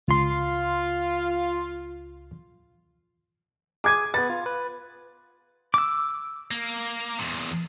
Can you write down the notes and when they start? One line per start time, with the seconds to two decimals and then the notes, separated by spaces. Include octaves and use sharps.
0.08 C#2 F4 C6
3.84 G#4 G#5 D6 G#6
4.14 B3 B4 A6
4.30 F4
4.46 B4
5.74 D6 E6
6.51 A#3
7.19 E2 A#2